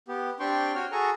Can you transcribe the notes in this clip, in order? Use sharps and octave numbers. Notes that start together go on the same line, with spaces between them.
B3 G4
C4 D4 G4 G5 C6 C#6
F#4 C#5 G5 F6
F#4 G#4 A4 G#5 A#5 C#6